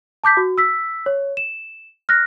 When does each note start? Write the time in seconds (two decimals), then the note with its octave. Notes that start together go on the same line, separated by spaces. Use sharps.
0.24 A5 D6 G6 B6
0.37 F#4
0.58 E6 B6
1.06 C#5
1.37 E7
2.09 F6 F#6 A#6